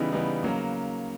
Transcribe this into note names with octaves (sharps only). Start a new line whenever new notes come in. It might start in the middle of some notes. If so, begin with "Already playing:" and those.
Already playing: C#3 E3 G3 B3 D#4
C#3 E3 G3 B3 D#4
C#3 F#3 A#3